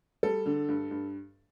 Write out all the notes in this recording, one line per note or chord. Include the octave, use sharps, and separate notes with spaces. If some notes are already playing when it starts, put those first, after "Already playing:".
G3 A4
D3
G2
G2